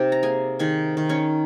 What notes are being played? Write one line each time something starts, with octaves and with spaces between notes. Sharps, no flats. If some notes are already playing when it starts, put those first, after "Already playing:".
Already playing: C3 D#4 G4 G5
A#5
A#3 G#4 G#5
D#3 G#4 G#5
D#3
C#4 C#5